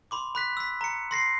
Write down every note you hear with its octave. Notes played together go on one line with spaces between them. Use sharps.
B5 C6 D6
B5 F#6 B6
E6 B6
A#5 C#7
C6 A#6 C7